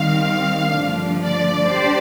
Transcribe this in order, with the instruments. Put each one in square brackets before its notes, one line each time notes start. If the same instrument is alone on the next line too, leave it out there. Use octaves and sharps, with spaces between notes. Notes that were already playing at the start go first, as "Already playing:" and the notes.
Already playing: [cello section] D#3 G3 C4 [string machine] F5
[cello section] G2 D3 F3 A3 D4
[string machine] D5
[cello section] D4 G4 C5